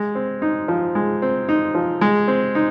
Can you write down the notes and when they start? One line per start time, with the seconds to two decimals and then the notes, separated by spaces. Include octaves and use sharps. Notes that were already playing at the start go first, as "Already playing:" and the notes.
Already playing: G#3
0.15 C4
0.42 D#4
0.68 F3
0.95 G#3
1.22 C4
1.49 D#4
1.75 F3
2.01 G#3
2.28 C4
2.55 D#4